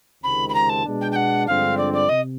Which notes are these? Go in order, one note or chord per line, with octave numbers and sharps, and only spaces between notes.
C#2 C3 D#3 G#3 C4 B5
B5
A#5
A5
B2 G#3 B3 D4
G5
G5
F#5
G2 D3 F3 G#3 C4 F5
D5
D5
C3 D#5